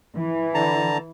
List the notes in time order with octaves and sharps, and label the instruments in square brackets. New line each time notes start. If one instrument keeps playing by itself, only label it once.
[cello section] E3
[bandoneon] D3 A5 A#5